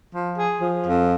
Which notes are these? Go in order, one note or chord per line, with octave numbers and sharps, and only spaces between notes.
F3
G#4
F3
F2